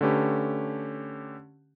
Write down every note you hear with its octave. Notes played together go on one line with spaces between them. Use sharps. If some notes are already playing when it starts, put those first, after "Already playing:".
D3 A3 C#4 G4 B4